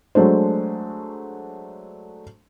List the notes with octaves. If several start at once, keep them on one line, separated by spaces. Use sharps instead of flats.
F#3 G#3 A3 D4 C5